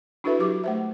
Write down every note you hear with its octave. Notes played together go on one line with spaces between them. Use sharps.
D4 E4 F#4 A4 B4 E5
F#3 E4 G4 D6
A3 C5 E5